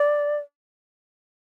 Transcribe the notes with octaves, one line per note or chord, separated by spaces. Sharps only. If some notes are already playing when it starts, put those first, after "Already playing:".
Already playing: D5